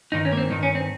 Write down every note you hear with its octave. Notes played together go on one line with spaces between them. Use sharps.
G2 D#3 D#4
C#4
A#3
C4
G2 D#3 D#4
C#4
C4